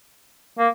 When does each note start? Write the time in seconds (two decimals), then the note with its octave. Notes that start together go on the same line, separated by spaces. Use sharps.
0.58 A#3